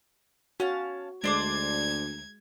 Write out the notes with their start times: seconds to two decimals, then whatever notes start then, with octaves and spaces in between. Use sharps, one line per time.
0.60 C#4 F#4 F5 A5
1.24 D2 G#3 D4 C5 D5 G#6